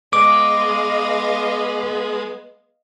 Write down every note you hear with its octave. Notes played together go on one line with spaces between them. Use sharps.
G#3 B3 D#5 F5 D6